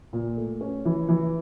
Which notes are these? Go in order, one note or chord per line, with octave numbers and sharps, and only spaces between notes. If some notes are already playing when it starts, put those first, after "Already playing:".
A#2
A3
C#4
E3
E3